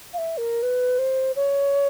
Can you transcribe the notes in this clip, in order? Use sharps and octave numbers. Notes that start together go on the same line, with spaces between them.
F5
E5
A#4
B4
C5
C#5